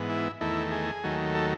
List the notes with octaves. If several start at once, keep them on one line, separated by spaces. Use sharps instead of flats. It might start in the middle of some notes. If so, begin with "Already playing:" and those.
Already playing: G#2 E3 B3
E4
E2 D#3 A3 E4
G#4
D#2 D#3 F#3 A3
A4